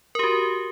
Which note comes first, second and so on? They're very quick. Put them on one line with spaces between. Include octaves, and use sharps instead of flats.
A#4 G4 F#4